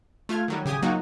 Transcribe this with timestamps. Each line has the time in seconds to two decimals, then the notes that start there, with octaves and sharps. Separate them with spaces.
0.29 A3 F4 F6 G#6
0.48 D#3 F#3 G3
0.65 A1 C#3 G4 G#5 D#6
0.82 F#3 A#3 D#4 F4 F#4